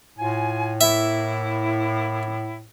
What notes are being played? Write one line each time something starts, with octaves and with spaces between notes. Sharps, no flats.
A2 F4 G#5
A#3 E4 E5